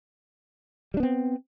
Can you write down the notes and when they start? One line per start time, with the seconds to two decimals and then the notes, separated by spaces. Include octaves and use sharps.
0.94 G3
0.97 D4
1.00 B3
1.03 C4